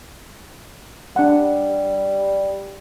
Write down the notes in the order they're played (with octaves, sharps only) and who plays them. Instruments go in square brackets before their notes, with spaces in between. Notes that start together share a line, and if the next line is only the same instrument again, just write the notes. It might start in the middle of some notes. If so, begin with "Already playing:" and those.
[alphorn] G3 [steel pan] D4 F#5